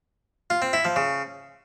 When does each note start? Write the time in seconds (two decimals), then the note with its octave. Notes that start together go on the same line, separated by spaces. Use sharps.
0.50 F4
0.62 C4
0.73 E4
0.85 F3
0.96 C#3